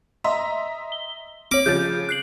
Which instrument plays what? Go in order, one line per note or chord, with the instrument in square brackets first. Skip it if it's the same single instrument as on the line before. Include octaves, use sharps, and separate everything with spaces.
[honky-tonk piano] D#5 E5 A#5 [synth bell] C6
[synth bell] G7
[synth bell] C4 C#5 [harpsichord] D6
[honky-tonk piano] C#3 F3 A6 [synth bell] G6
[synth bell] F#6 C7 F#7